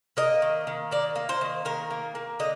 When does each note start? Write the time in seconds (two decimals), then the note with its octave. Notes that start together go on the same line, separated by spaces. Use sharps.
0.17 A#3 D#5
0.42 D#3
0.67 D#3
0.91 A#3 D5
1.16 A#3
1.29 C5
1.41 D#3
1.65 D#3 A#4
1.91 A#3
2.15 A#3
2.39 D3 D#5